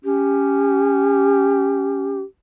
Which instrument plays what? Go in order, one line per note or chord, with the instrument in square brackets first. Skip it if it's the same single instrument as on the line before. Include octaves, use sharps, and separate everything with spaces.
[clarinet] C#4 [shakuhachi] G4